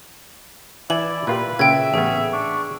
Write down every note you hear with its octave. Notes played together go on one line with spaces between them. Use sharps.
E3 E4 D5 E5 G#5 F#7
A#2 F4 G4 B4
A#2 C#3 E5 G5 G#6
A1 B3 C#4 G#4
D4 C#6